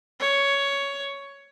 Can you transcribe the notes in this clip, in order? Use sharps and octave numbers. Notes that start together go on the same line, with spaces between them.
C#5